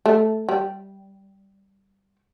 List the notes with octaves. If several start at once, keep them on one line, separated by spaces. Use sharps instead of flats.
A3
G3